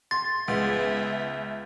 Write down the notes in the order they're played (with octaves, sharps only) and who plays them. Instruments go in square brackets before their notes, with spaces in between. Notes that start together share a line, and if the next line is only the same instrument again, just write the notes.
[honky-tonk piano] C6 [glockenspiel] A6
[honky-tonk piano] C#2 [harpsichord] G#3 B3 [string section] E5